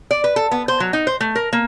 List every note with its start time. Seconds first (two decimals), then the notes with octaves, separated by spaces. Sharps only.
0.11 D5
0.24 B4
0.36 A4
0.51 B3
0.68 C5
0.80 F#3
0.93 D#4
1.07 C5
1.21 A3
1.36 A#4
1.53 A#3